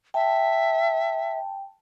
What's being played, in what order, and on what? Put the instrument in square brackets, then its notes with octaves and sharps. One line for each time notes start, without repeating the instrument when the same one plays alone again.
[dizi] E5 [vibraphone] G5 A5